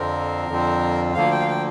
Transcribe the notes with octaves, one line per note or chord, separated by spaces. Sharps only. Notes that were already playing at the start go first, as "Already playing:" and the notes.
Already playing: F2 D3 F3 C4 A#4
F2 D3 F3 C4
D2 D3 F3 A#3 F5
G5
F5
G5